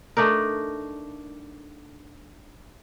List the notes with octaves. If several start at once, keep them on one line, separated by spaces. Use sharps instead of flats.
A3 D4 D#4 A#4